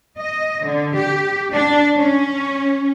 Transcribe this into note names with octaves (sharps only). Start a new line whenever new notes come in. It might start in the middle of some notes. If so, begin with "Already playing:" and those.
D#5
D3
G4
D4
C#4